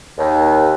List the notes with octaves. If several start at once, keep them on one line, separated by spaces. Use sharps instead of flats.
D#2